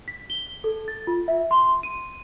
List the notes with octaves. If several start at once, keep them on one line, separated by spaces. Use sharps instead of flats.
B6
G7
A4
A6
F4
E5
C6
D#7